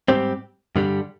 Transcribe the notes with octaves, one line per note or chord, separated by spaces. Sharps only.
G#2 G3 C4 G4
G2 D3 G3